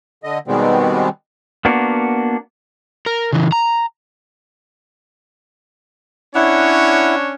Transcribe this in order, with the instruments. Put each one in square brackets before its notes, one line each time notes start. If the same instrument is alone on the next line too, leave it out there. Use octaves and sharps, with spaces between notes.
[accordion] D3 D#5
B2 D#3 G3 G#3 B3 C4
[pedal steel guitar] A#3 B3 D4 F#4 A#4
[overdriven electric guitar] A#4
C#3 E3
A#5
[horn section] C#4 D4 C#5 [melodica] E4 F#5